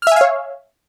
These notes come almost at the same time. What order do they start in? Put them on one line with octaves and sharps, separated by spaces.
F6 E5 G#5 F5 C#5